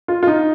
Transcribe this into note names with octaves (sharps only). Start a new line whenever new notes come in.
F4
F4
D#4